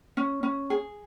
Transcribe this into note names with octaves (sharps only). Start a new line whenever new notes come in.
C#4
C#4
G#4